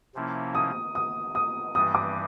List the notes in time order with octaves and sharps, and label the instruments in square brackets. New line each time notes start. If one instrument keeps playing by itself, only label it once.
[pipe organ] C3 F3 A#3 C#4 E4
[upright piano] D#6
D#6
D#6
[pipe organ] G2 E3 G3 [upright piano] D#6
[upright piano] D6